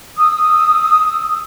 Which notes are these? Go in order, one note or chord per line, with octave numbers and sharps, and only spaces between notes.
D#6 E6